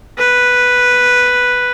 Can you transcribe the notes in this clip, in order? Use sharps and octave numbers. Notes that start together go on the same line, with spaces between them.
B4